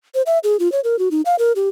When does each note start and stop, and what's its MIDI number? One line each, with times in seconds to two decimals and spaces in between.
0.15 0.22 72
0.26 0.39 76
0.44 0.57 68
0.59 0.71 65
0.72 0.80 73
0.84 0.98 70
0.99 1.09 66
1.11 1.21 63
1.25 1.36 77
1.39 1.52 70
1.56 1.69 67